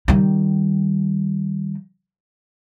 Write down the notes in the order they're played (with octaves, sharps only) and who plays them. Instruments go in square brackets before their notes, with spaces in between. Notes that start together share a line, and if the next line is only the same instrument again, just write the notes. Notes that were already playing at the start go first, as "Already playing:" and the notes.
[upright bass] D#3 G3